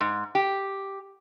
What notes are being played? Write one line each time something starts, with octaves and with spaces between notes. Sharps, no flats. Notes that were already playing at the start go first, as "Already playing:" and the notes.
G#2
G4